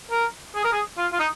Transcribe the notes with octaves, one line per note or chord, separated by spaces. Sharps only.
A#4
G#4
A#4
G#4
F4
F4
D#4